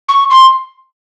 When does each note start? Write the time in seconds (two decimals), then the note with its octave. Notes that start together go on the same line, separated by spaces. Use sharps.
0.09 C#6
0.30 C6